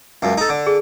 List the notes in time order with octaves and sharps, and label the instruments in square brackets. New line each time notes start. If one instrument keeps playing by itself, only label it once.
[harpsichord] C#2 F#2
D#4 A4
D3
[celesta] G#4